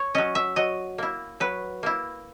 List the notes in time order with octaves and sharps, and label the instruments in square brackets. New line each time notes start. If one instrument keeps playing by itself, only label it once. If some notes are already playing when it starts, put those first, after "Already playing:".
Already playing: [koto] C#5
F#3 C#4 D#5
E5
F#3 D#5
A#3 E4
F#3 B4
A#3 E4